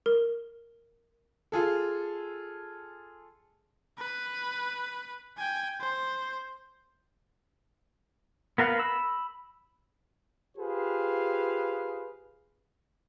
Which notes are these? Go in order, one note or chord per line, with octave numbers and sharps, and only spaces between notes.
A#4
F4 G#4 A4
B4
G5 G#5
C5
B3 A#4 F5 F#5
B5 E6
F4 G4 G#4 B4 C5 F5